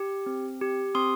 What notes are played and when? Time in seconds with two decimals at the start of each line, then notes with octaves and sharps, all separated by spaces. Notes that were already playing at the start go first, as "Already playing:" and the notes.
Already playing: G4
0.26 C4
0.61 G4
0.95 C4 C6 D#6